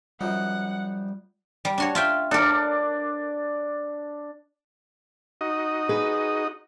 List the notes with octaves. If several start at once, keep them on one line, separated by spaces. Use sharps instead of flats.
F#2 F3 G3 D#4 F#5
G3
D4 F#4 C#5
F4 E5 G5
D4 A4 A#4 D6
D#4 F#4 D#5
G#4 B4